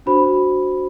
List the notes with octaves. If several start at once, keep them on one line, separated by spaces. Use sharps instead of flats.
D4 F#4 C5 B5